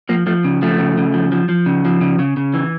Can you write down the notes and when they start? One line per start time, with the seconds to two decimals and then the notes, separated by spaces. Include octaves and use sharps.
0.09 F3 A#3
0.27 F3 A3
0.44 C#3
0.62 F3 A3
0.79 C#3
0.97 C#3
1.14 F3
1.32 F3
1.49 F3
1.66 C#3
1.85 F3
2.01 C#3
2.19 C#3
2.37 C#3
2.54 E3